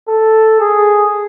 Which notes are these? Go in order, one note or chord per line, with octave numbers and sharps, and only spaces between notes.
A4
G#4